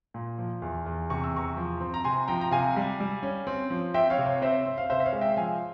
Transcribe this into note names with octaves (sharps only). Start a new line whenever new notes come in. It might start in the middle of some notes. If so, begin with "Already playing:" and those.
A#2
F3
E2
E2
C3 C#6
E6
E2 A#5 C#6
F3
C4
A#5
C3 G#5 C6
F3 G5 A#5
A#5
C3 F5 G#5
G3
G3
C#4
C4
F3
C4 E5 G5
C#5 F5
C3
C#5
C4 C5 E5
C4
F5
C3 C5 E5
E5
C#5 F5
G#3
E5 G5
F3 F5 G#5